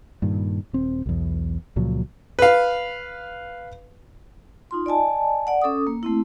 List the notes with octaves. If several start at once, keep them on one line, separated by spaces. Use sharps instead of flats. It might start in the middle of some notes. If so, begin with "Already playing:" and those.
G2 A#2 D#3
D#1 C4
B1 E2
C#2 A#2 F3 F#3
B4 F5
D#4 F4 C6
D5 D#5 G#5 A5
D5 F#5
C#4 A4 D6 D#6
A#3
A3 C4 E4